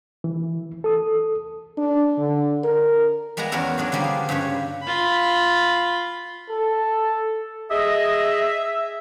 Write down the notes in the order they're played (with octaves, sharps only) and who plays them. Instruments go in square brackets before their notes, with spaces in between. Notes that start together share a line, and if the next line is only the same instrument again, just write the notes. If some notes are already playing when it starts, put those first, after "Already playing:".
[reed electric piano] E3
A4 D#6
[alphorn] D4
D3
A#4
[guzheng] G3 G#3 B3 G#5 A#5
E2 B3 C#4 F#4 A#4 E5
F#3 B3 D4 G#4
D3 F3 G3 A#3 F4
G#4
G2 C#3 G4 B4 C#5
[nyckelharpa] F4 B5
[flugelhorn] A4
[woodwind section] G#4 D#5 [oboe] E5